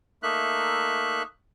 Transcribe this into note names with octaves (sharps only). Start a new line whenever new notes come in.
A3 A#3 D#4 E5 F#6